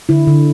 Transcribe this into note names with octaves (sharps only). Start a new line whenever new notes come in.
D3 E4
D3